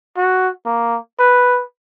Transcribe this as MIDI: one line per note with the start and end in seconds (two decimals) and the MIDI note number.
0.17 0.50 66
0.66 0.98 58
1.19 1.63 71